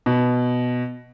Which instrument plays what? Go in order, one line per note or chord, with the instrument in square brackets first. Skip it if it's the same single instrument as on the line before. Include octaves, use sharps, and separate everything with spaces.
[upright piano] B2